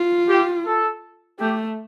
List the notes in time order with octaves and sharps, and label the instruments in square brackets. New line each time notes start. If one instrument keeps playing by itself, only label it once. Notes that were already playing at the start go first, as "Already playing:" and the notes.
Already playing: [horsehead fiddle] F4
[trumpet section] G4
A4
[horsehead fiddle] A3 [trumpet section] G4